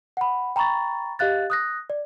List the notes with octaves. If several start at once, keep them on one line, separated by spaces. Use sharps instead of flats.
F#5 B5
G5 A#5 B5 C#6 A6
G4 D#5 F5 F#6 A6
D#6 F#6 A#6
D5